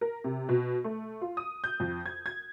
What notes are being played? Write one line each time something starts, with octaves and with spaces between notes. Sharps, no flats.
A#4
C3
B2
A3
F4
D#6
G6
F2
G#6
G#6